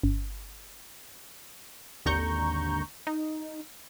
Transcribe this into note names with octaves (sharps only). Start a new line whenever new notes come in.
G1
G#1 D#2 D3 A#5 C#6 G6
D#4